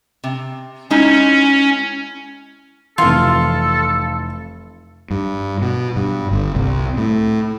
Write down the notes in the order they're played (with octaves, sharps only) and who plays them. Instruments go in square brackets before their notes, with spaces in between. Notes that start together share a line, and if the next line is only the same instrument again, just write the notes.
[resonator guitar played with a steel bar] C3
[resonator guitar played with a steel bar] G#3 D#4 E4 [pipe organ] C#4
[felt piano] F1 E3 [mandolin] F4 [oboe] A4
[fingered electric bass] G2
B2
G2
G1
C2
A2